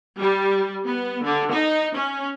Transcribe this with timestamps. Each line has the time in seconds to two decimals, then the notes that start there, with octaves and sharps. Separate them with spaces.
0.17 G3
0.86 B3
1.24 D3
1.53 D#4
1.97 C#4